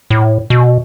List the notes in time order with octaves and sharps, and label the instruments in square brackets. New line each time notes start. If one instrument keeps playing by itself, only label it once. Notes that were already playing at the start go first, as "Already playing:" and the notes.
[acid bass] A2
B2